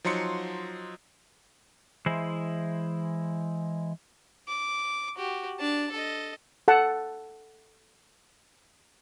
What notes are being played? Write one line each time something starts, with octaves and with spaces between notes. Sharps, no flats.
F3 F#3 D#4 C6 C#7
E3 G#3 E4 C5
D6
F#4 G4
D4 A5
A4 D#5
A4 F#5 A5